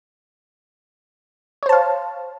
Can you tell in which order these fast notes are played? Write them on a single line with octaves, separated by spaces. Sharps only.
C#5 C5 A5 F5